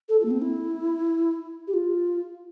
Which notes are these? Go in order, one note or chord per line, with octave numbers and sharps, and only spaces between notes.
A4
F4
A#3
C4
E4
G4
F4